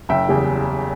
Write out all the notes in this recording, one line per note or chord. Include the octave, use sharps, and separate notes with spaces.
F#1 E5 G5
E2 C#3 G3